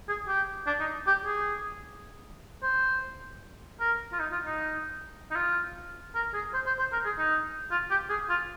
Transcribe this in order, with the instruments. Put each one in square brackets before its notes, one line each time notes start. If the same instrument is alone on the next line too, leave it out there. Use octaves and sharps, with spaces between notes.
[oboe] G#4
G4
D4
D#4
G4
G#4
C5
A#4
F4
D#4
F4
D#4
D#4
F4
A#4
G#4
C5
C5
C5
A#4
G#4
D#4
F4
G4
G#4
F4